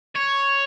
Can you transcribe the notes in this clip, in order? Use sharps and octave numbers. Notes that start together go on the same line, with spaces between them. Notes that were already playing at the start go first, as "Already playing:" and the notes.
C#5